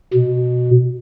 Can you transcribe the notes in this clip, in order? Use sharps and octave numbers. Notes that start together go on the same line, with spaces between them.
B2